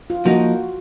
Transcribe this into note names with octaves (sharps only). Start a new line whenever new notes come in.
F4
F3 A#3 D#4 F#4